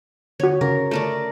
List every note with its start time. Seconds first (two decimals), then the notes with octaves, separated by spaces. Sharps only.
0.40 D3 F#4 C#5
0.61 C#3 A#4
0.91 A3 A#4 D5